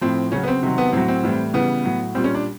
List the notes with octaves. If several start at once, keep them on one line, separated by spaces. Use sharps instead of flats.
A2 F3 C4
C#3 F#3 C#4
B3
C4
C3 D#3 F#3
B3
A2 F#3 C4
C4
A2 E3 G3
C#3 E3 G3 B3
A2 F#3
A#2 G3 C4
C#4
D4